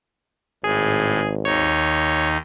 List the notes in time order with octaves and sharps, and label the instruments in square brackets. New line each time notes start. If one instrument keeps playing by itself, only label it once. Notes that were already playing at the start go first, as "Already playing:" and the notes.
[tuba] G#1 [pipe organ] A2 [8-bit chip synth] G#4
[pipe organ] D#2 D#4 [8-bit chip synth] C#5